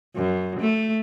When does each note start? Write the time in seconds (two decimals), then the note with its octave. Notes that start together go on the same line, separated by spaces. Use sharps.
0.16 F#2
0.60 A3